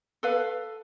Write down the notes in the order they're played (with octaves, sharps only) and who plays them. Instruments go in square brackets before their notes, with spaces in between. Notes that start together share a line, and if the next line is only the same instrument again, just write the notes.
[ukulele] A4 B4 F5